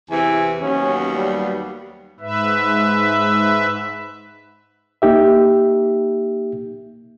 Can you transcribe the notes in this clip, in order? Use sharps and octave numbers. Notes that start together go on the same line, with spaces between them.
E2 C3 E3 G#5
D#2 F#3 B3 C#4
G3
G#2 B4 E5
A#3 D#4 G4 E5